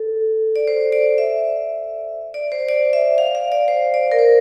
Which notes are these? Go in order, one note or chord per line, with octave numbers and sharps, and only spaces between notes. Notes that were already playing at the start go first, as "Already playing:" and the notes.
Already playing: A4
D5
C5
D5
E5
D5
C5
D5
E5
F5
F5
D5
C5
D5
A#4
C5